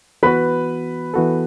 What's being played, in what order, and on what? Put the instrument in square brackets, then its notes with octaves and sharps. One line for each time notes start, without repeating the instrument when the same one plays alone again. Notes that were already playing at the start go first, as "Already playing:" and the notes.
[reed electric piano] E3 B3 F#4 [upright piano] B4 B5
[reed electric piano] E3 B3 F#4 A4